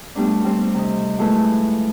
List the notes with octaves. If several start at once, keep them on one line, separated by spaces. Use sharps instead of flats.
G3 A3 B3 D4
G3 C4 C5
C3 D#5
F3 G#3 A3 E4 B4